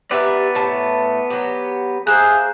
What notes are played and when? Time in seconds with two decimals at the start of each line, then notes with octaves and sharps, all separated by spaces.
0.11 B3 G4 B4 D5 E5
0.55 A2 A3 A5
1.30 F#3 G4
2.07 A#3 G#4 C5 E5 F#6